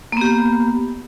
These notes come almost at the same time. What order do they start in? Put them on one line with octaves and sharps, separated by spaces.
A#3 B3 G4